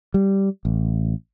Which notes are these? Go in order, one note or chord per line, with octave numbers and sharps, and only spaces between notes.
G3
A1